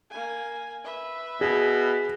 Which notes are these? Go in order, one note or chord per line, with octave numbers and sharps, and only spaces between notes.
A#3 G#5
B4 E5
B2 G#4